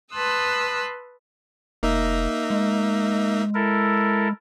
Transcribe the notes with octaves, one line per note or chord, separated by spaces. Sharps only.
B4 A5 C6 D#6 E6 F#6
F1 A#3 D#4 E5
G#3
E4 A4 A#4